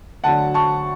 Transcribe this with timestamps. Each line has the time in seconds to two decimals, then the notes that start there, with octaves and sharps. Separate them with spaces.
0.24 D2 D3 F#3 F#5 A5
0.54 A5 C#6